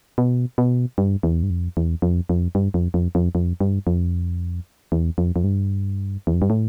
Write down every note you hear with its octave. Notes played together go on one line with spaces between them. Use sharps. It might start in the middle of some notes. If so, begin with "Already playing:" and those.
B2
B2
G2
E2
G2
F2
E2
F2
F2
G2
F2
F2
F2
F2
G2
F2
E2
F2
F2
G2
E2
F2
G2
A2